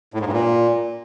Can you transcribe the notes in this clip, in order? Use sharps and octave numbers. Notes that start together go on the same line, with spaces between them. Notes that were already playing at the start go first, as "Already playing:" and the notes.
A2
G#2
G2
A#2